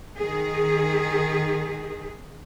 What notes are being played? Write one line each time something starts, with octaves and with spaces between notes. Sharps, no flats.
D#3 G#4